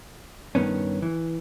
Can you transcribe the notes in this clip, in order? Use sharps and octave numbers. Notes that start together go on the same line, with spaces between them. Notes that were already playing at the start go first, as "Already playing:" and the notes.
G2 D#3 B3 C#4
E3